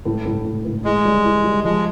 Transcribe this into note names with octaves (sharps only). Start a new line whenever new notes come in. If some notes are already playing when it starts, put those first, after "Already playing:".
A2
A2
A2
A2
E3 G#3
G3
E3
G3
F3 G#3